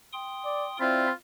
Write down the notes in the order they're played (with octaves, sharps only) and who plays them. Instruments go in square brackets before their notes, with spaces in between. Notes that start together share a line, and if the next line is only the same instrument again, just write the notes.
[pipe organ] G5 C6 D#6
[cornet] D5
[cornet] C4 [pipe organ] E4 D5 E5 [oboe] F4